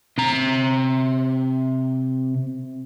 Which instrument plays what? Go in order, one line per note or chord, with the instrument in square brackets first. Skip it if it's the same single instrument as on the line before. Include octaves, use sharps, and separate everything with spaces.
[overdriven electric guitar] C3 A#5